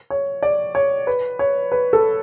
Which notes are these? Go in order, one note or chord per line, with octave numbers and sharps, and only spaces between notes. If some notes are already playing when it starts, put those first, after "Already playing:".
C#5
D5
C#5
B4
C#5
B4
A4